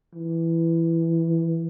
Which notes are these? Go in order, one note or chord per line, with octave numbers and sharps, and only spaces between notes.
E3